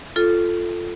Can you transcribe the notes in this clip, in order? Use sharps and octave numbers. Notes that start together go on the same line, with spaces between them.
F4 A4